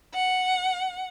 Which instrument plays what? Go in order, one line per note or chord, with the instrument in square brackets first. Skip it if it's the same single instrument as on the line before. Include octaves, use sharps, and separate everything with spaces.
[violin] F#5